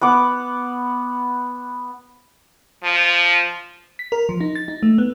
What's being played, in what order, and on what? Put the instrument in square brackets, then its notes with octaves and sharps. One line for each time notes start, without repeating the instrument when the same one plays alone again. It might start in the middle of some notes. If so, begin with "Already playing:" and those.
[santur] B3 F#5 D6
[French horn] F3
[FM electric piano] B6
A#4
F3
D#4
A6
D#4
A3
B3